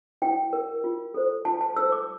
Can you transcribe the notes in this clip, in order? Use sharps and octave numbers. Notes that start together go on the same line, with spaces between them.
E4 G5
A#4
F4
A4 C5
F4 A5
A5
A4 C5 E6
D6